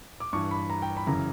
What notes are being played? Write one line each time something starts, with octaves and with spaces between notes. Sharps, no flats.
D6
G2 E3 C#6
B5
A#5
G5
B5
F#2 C#3 E3 A#5